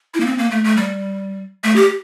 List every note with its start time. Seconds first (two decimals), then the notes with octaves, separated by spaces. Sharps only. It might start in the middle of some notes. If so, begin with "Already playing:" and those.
0.14 E4
0.20 A#3
0.26 C4
0.38 A#3
0.51 A3
0.64 A3
0.77 G3
1.64 A3
1.76 G4